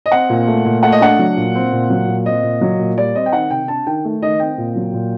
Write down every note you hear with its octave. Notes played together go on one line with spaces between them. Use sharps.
D#5
C4 F#5
A#2
A3
A#2
A3 F#5
D#5
D4 F#5
F#3
A#2
C4
A#2
F#3
A#2
C4 D#5
A#2
F#3
A#2
G3 D5
C4 D#5
G5
D#3 F#5
C3 G5
D4 A5
D#3 G5
A3
D#3 D#5
C4 G5
A#2
F#3
A#2